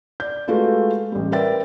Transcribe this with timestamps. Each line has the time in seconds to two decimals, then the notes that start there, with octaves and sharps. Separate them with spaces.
0.20 D5 G6
0.48 G#3 A3 F4 F#4 A4 B4
1.12 A1 G3
1.32 A#4 B4 D5 E5 G5 A6